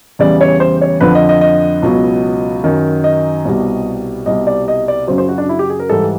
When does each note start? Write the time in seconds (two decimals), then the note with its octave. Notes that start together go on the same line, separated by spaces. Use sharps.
0.19 E2 C#3 E3 G3 D5
0.41 C#5
0.60 C5
0.81 C#5
1.01 F2 D3 F3 B4
1.15 D#5
1.29 D#5
1.41 D#5
1.82 C#2 B2 F#3
2.64 F#2 D#3 F#3
3.04 D#5
3.45 C2 B2 G3
4.26 C2 B2 G3 D#5
4.47 D5
4.68 D#5
4.88 D5
5.07 F#2 C#3 F#3 C5
5.18 C5
5.29 F#4
5.38 D4
5.49 E4
5.59 G4
5.70 G#4
5.80 A#4
5.89 G#2 E3 G3 A4